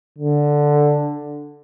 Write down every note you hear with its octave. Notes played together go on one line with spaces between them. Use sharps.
D3